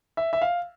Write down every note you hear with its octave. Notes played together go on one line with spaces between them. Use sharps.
E5
E5
F5